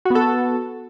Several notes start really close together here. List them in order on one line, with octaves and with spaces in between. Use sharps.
F#4 B3 A4